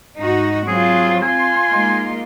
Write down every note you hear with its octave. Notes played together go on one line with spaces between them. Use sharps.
G#2 D#4 F#4
F#3 C4 F4 G#4
F4 G#5 C6
G#3 A#3 D#4